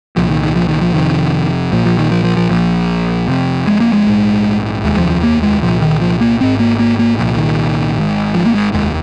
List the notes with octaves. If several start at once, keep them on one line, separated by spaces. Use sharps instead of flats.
C2 A#2 F3
D#3
D#3
F3
D#3
F3
F1 F2 C3 D#3
A#1 A#2 F3
F3
D#3
F3
F3
F3
A#1 A#2 F3
F1 F2 C3
G#3
A#3
G#3
A#1 G#2
F1 D#2 G#3
F3
F3
A#3
G#3
C2 A#2 F3
D#3
F3
A#3
G#1 G#2 C4
A#3
A#3
A#3
C2 A#2 F3
D#3
G#1 G#2
F3
A#3
G#3
F1 D#2 G#3